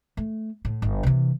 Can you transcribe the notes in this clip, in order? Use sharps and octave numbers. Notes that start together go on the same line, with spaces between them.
A3
A2
G1
C3 E3